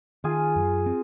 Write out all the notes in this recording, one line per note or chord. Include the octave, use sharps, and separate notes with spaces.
D#3 F4 G#4
F#2
C4